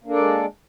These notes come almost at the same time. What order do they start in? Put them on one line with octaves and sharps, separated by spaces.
A#3 D4 A4 D5 G#3